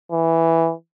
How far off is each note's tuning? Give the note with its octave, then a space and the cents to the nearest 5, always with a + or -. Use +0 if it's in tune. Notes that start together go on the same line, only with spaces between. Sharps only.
E3 +0